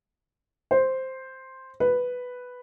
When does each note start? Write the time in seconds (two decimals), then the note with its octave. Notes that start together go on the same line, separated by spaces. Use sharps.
0.71 C5
1.80 B4